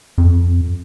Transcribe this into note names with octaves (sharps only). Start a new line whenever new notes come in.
F2